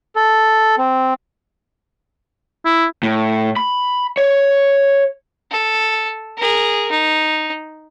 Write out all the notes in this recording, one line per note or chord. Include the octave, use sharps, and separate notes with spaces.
A4
C4
E4
A2
B5
C#5
A4
G#4 A#4
D#4